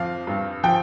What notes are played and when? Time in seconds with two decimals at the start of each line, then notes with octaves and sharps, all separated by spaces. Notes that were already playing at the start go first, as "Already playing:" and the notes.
Already playing: F2 F3 F5
0.27 G2
0.63 F3 G5